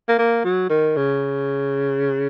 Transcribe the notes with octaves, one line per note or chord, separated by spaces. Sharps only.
A#3
A#3
F#3
D#3
C#3